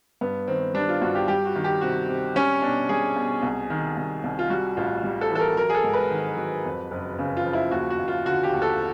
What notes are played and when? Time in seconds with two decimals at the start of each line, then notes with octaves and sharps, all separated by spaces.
0.21 G2 B3
0.47 D#3 C4
0.74 G3 D4
0.89 F4
1.02 G2 F#4
1.15 G4
1.28 G3 G4
1.46 F#4
1.56 D#3
1.64 G4
1.81 C3 F#4
2.09 C3
2.35 G3 C#4
2.62 B2 D4
2.89 G3 G#4
3.16 B2
3.43 C2
3.70 D#3
3.97 C2
4.24 C2
4.39 F4
4.50 G3 F#4
4.77 A1 F4
5.03 G3
5.21 A4
5.30 E3
5.35 A4
5.40 A#4
5.57 F#3 A#4
5.70 G#4
5.75 A4
5.84 G#2
5.94 B4
6.10 D#3
6.37 F#3
6.65 F2
6.91 F#1
7.19 C#3
7.37 F4
7.45 F3
7.53 E4
7.71 D#2 F#4
7.90 F#4
7.99 D#2
8.08 F4
8.26 D3 F#4
8.43 G4
8.53 D#2
8.62 A4